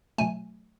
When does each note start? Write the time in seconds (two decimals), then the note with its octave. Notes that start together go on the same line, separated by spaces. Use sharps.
0.18 B2 F#3 A3 G#5